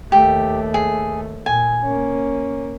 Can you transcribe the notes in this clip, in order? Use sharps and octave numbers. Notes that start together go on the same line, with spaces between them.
D#2 A3 G4
G#4
A#2 G#5
A#3 C#4